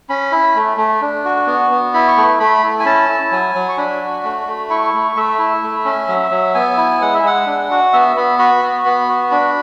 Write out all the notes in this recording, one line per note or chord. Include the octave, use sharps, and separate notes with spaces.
C#4 B5
E4
A3
A3
D4
F#4
B3
B3
E4 B5
C#6
A3
A3 B5
E4
G#5
C#4 A5
E4
F#3 G#5
F#3
C#6
D4 B5
F#4
A3
A3
E4 C#6
A3
A3 E5
E4
A3
C#4
F#3
F#3
B3 G#5
E4
G#3 F#5
E5
G#3 F#5
D4
F#4
B3 E5
B3 B5
F#4 B5
B3
B3
F#4
D4 B5